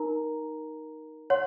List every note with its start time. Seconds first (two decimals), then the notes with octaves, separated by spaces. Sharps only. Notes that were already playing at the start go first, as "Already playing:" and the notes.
Already playing: D#4 A#4 A#5
1.30 C#5 F#5 C6